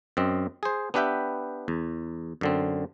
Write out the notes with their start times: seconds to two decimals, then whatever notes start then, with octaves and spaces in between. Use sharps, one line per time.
0.17 F#2 C4 D#5
0.63 G#4 C5
0.94 B3 D4 G4 B4 E5 G5
1.68 E2
2.41 F#2 D3 C4